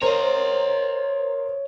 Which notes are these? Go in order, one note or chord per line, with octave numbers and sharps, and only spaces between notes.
A#4 C5 C#5 D#5 A#5